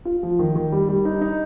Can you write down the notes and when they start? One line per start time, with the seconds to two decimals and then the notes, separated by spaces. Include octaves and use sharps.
0.05 F4
0.23 F3
0.39 D#3
0.56 D#3
0.72 G3
0.89 G3
1.05 D#4
1.21 D#4